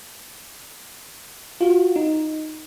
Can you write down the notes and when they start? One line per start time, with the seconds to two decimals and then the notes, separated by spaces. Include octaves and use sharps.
1.61 F4 F#4
1.96 D#4